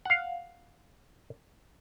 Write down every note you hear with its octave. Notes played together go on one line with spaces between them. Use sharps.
F5 F#5